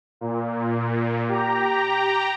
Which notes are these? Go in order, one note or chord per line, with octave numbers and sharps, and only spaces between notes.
A#2
G4 A#5